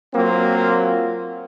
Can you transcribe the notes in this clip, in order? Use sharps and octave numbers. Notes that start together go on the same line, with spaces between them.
F#3 A#3 C4 F4